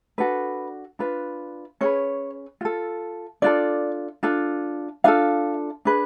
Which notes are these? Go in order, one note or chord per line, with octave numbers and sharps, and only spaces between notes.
D4 F#4 A4 B4
D4 F4 B4
C#4 G#4 B4 C#5
F4 A4
D4 F4 A4 D5
D4 F4 A4
D4 F4 A4 F5
D4 G#4 B4